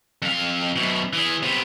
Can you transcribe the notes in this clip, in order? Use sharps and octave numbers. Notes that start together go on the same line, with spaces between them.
F2 F5
F#2 B2
E3 G#4
C3 B3